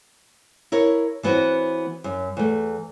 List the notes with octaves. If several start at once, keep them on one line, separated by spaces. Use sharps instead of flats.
E4 A#4 C#5
E3 B3 C4 F#4 C#5
F#2
E2 A3